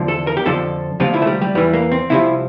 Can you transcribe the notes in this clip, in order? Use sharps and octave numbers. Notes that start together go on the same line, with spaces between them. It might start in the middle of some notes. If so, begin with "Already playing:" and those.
Already playing: E2 D3 F3
A4
A#4
G4
F2 D3 F3 A4
D2 C3 F3 F4
E4
A3
G3
G3
E2 E3 G3
A#3
C4
C2 C3 F3 E4